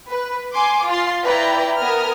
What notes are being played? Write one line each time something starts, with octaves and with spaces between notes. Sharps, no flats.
B4
G#5 C6 D6
F4 A6 C7
E4 B4 D5 G5 A#5
B3 A#4 G#5 D#6 F6